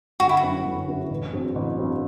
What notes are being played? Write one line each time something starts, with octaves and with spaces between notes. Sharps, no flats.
G1 F#4
E4
F#4
F#2 F#3 B3 E4
G1
F#2 F#3 B3 E4
A1
G2 F#3 C4
A1
G2 F#3 C4